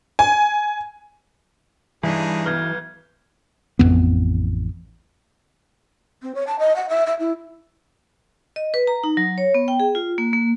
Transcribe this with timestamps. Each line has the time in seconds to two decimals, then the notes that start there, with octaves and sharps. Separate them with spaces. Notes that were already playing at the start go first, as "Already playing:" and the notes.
0.19 G#5
2.04 G2 E3 D4 D#4 G#4
2.46 B1 B3 F6 G6 G#6
3.79 A1 F2 B2 B3
6.22 C4
6.35 C#5
6.47 A5
6.59 D#5
6.76 F#5
6.89 E5
7.06 E5
7.19 E4
8.56 D#5
8.74 B4
8.87 A#5
9.04 D#4
9.17 F#3
9.38 C#5
9.54 B3
9.68 G5
9.80 G#4
9.95 F4
10.18 A#3
10.33 A#3